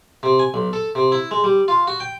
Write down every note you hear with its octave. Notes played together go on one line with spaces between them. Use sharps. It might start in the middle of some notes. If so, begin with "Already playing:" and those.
C3
G#5
B1
A4
C3
E4
G#3
G3
F4
F#4
G5